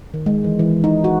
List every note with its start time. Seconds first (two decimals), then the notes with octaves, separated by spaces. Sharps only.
0.14 D#3
0.26 G#3
0.44 E3
0.59 E3
0.84 D#4
1.04 F#4